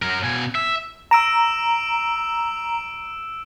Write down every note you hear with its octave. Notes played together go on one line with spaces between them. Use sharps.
F#3 A#4
B2 G#5
E5
A#5 E6 D7 E7